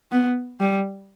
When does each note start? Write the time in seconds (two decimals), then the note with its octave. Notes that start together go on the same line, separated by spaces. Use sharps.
0.12 B3
0.60 G3